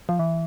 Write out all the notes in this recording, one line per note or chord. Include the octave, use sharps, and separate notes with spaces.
F3
E3